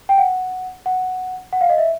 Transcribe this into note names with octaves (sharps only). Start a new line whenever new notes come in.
G5
F#5
F#5
F#5
F5
D#5
E5